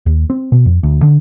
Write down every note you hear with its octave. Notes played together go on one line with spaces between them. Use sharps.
D#2
C4
B2
F2
D2
D3